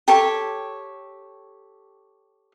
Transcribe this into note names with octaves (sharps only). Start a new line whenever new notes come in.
G4 A4 C#5